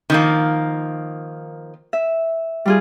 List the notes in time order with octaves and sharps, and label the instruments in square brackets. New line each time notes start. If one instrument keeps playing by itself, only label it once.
[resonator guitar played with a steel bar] D#3 F3 A#3
[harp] E5
G3 F4 G#4